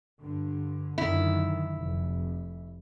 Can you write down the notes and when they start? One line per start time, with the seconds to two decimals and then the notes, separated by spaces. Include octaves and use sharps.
0.20 G2 D3
0.98 F#2 D3 D#3 E4
1.76 F1